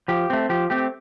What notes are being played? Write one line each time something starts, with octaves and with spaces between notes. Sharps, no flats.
F3 G4
A3 C4
F3 G4
A3 C4 G4